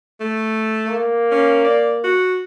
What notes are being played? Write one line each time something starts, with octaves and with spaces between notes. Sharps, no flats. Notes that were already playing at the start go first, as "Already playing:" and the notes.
A3
A#3
C#4
D5
F#4